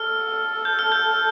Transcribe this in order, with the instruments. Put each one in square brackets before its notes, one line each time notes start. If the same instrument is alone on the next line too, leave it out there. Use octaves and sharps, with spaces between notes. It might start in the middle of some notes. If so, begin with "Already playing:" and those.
Already playing: [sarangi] A4 [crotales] F6
[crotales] G6
F6
G6